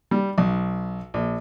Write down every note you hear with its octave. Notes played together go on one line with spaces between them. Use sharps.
G3
B1
A#1